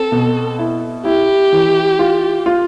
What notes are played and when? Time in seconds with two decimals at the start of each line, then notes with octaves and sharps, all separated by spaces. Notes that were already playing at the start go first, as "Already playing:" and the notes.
Already playing: C4 A4
0.12 B2
0.59 E4
1.05 E4 G4
1.53 E3
1.99 F4
2.46 F4